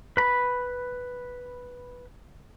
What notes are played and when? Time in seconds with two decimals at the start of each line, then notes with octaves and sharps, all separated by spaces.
0.17 B4 B5